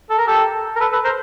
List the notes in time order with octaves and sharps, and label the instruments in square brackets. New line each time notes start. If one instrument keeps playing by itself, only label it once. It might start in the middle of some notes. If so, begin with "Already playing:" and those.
[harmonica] A4
A#4
G4 A4
A#4
A4 B4
A4 B4
A#4 C5